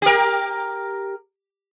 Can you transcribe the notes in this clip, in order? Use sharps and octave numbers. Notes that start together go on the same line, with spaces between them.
G4 A#4